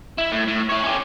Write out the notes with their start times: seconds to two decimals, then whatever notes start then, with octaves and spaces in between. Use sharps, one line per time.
0.18 E4
0.32 A2
0.48 A2
0.69 E4 C#5
0.84 C#4 G4